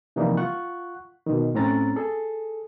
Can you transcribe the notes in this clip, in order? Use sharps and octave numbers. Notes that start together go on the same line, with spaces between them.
C3 E3 F3 G3 A#3 D#4
F4 F#5 C#6 F#6
B2 D#3
A2 C4 C#4 A#5 A6
G#4 A4